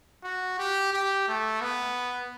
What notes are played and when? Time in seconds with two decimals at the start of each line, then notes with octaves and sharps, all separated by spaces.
0.24 F#4
0.59 G4
0.93 G4
1.28 A3
1.61 B3